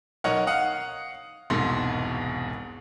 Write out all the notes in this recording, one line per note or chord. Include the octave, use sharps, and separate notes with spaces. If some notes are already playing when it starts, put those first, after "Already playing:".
B1 D#4 A#4 C#5 F#5
F5 F#5 D#6
E1 C2 G#2 B2 C6